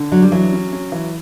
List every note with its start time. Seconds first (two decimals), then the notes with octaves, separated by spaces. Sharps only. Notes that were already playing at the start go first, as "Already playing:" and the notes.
Already playing: D3
0.12 F#3 D4
0.22 G3
0.32 E3 F#3
0.53 C#4
0.73 C#4
0.92 E3